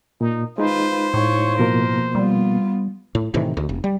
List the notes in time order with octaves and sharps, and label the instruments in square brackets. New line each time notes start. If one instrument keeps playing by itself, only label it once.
[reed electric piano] A#2 [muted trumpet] D#4
[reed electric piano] G#3 D#4 [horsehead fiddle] F4 B4 [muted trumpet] C5
[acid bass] A2 [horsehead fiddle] F4 C#5
[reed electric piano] B2 F3 A#3 [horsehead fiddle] A#4
[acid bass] G3 [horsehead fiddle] B3 F4
[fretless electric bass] A2
A2 C3 D#3 E3
D2
F1
G3